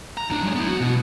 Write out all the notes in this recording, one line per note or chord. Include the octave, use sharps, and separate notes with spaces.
A#5
A2 D4
F#3 G#3
B3 E4
F#4
B2